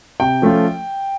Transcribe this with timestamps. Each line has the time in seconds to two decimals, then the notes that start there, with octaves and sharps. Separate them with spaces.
0.20 C3 G5
0.42 F3 A3 C#4 F4